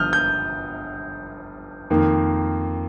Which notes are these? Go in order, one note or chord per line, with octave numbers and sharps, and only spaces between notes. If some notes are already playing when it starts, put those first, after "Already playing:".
Already playing: G1 G2 F3 D#6 F6 G6
G6
F2 D#3 A#3